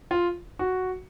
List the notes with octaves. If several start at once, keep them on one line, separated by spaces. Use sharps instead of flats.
F4
F#4